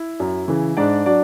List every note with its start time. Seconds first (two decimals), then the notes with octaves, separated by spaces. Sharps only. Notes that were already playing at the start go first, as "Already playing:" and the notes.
Already playing: E4
0.20 F#2
0.48 C#3 E3
0.77 G#2 D4 D5
1.06 F#3 D4 D5